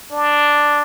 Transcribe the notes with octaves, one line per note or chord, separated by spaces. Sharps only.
D4